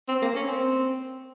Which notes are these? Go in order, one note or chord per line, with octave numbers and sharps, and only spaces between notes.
C4
A#3
C#4
C4